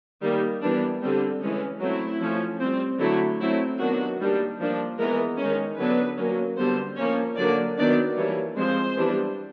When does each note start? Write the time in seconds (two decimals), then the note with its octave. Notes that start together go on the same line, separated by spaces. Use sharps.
0.22 D#3 G3 A#3
0.62 E3 G3 B3 D4
1.02 D3 G3 C4
1.41 E3 G#3 C#4
1.80 F#3 A3 C4 E4
2.21 F3 A3 C#4
2.60 G3 C4
3.00 D3 F#3 A3 E4
3.40 F#3 A3 C4 E4
3.79 D#3 F#3 B3 D4 F#4
4.19 D#3 G3 A#3 D4
4.59 F3 A#3 D4
4.99 E3 G#3 B3 A#4
5.38 D#3 G#3 C#4
5.78 D3 F#3 B3 D4 B4
6.18 F#3 A#3 C#4
6.57 D3 G3 B3 C5
6.97 F3 A#3 C#4 C#5
7.37 D3 F#3 A#3 D4 D5
7.76 D#3 F#3 B3 D4 D5
8.16 E3 G3 A#3 D4 C#5
8.56 F3 G#3 C4 C5
8.96 E3 G3 B3 D4